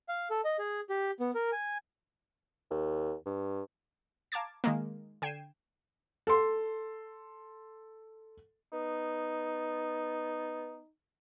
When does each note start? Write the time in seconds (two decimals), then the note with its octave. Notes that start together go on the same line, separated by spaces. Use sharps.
0.09 F5
0.31 A4
0.45 D#5
0.59 G#4
0.90 G4
1.20 B3
1.35 A#4
1.52 G#5
2.70 D#2
3.26 G2
4.32 F5 A5 A#5 D6 G#6 A6
4.64 D#3 G#3 A#3
5.22 D3 G5 G#6 C7 D#7 E7
6.27 A4 C6
8.73 B3 D#4